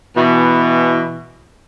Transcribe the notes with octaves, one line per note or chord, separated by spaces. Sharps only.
B2 E3